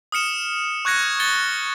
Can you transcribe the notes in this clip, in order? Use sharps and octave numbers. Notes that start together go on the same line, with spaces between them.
D#6 F6 C#7 E7
C#6 F#6 G#6 A#6 C#7
A6 C#7 G7